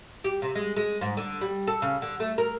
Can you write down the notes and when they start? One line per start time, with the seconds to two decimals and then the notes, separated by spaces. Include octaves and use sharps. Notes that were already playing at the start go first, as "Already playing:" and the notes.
0.24 G4
0.42 C3
0.55 G#3
0.77 G#3
1.01 G#2
1.17 D3
1.41 G3
1.67 A4
1.82 C#3
2.02 D3
2.20 A3
2.38 A#4